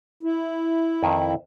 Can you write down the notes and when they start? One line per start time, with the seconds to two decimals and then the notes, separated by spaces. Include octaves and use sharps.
0.23 E4
1.03 F2 D#3 E5